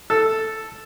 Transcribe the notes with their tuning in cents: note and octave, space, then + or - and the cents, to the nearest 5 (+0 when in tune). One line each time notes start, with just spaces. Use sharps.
A4 +0